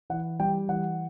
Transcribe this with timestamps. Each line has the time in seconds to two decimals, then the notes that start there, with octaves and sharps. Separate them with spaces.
0.10 E3 F#5
0.40 G3 G5
0.68 E3 F#5